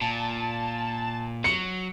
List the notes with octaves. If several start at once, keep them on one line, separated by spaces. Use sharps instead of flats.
A#2 A5
F#3 C#7